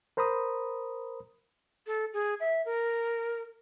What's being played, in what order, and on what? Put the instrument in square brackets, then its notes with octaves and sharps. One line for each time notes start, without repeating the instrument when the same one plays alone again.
[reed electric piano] A#4 C5 A#5 B5 D#6
[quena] A4
G#4
E5
A#4